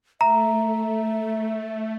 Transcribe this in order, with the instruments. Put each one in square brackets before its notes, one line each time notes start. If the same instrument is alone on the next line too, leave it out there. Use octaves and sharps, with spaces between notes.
[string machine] A3 [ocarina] E5 [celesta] A#5